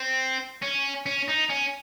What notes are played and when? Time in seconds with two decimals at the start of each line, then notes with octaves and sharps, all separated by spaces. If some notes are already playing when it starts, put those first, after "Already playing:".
Already playing: C4
0.62 C#4
1.06 C#4
1.28 D#4
1.49 C#4